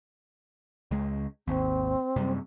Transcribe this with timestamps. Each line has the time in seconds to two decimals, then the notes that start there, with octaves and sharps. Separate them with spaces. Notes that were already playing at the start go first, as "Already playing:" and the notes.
0.91 C#2 G#3
1.48 G#1 D#2 C4
2.16 F#2 C3 G3